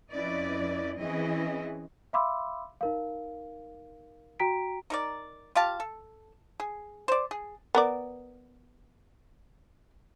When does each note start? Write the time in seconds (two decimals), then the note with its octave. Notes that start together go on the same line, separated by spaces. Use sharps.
0.11 F2 C#4 E4 B4 D5 D#5
0.98 E3 C4 C#4 E4 G#4 D#5
2.13 E5 F5 B5 C6 D6 E6
2.81 D#4 A#4 F5
4.40 F#4 G5 A#5 B6 D7
4.90 D#4 A#4 D5
5.55 F4 G4 F5 A5
5.80 A4
6.60 G#4
7.08 C5 D5
7.31 G#4
7.75 B3 A#4 D5